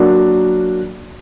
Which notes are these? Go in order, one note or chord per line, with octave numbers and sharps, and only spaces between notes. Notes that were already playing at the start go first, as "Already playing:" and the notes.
Already playing: F#3 A#3 D4 F#4